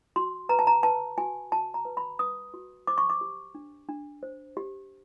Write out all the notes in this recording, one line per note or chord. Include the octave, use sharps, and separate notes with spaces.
F#4 C6
B4 A#5
A5
A#5
B4 A5
F#4 G#5
F#4 A5
A#5
B4
B5
B4 D#6
F#4
C5 D6
C#6
D6
G4
D4
D4
C5
G4